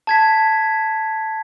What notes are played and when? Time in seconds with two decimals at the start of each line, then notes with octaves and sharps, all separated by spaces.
0.07 A5 G#6 B6